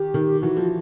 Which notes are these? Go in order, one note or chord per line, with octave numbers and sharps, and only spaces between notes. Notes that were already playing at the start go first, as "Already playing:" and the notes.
Already playing: D#3 G4
D#3
E3 F#4
F3